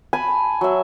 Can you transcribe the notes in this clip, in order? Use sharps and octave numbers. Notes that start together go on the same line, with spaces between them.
G#5 A5 B5
F#3 E5